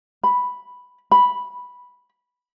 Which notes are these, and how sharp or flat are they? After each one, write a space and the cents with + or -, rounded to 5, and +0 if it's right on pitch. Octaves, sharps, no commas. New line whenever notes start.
B5 +0
B5 -5